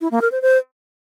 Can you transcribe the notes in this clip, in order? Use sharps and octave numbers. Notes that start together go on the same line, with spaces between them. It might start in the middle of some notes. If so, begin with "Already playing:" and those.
E4
A#3
A#4
C5
C5